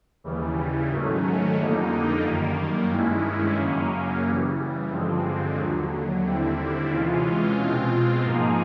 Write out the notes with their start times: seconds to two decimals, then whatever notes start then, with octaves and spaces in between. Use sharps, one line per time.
0.24 D#2 C#3 E3 G3
0.91 G#2 D#3 F#3 A3 C#4
1.58 F2 D3 G3 A#3 D#4
2.25 F#2 D#3 G3 A#3
2.91 G2 D#3 G#3 C#4 E4
3.58 F#2 C#3 F#3 A#3 C#4
4.24 C#3 E3 G3
4.91 G2 D3 F3 G#3 C4
5.58 D#2 D3 F#3
6.25 D#2 D3 G3 C4 E4
6.91 C3 E3 G#3 C#4 F4
7.58 B2 G#3 C4 F4
8.24 G#2 F3 A#3 D#4 G#4